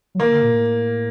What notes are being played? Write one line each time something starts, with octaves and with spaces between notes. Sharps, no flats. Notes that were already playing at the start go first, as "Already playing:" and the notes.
F#3
D#3 A#3
D3
A#2
A2